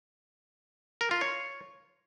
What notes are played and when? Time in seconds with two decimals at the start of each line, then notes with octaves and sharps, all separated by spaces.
1.01 A#4
1.11 F4
1.21 C#5